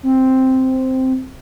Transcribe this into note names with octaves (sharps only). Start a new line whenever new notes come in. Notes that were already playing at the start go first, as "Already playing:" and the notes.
C4